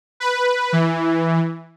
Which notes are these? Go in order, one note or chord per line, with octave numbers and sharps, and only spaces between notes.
B4
E3